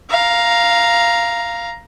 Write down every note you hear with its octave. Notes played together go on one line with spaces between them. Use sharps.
F5 A#5